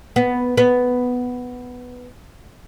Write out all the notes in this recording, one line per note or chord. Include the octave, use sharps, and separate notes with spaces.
B3
B3